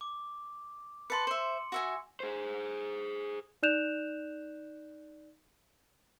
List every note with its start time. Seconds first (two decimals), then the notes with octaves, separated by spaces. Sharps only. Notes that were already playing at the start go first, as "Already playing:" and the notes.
0.01 D6
1.10 B4 A5 C6 C#7
1.27 C5 E5
1.72 F#4 E5 G#5
2.20 G#4 C5
3.63 D#4 D5 F#6 G6 E7 F7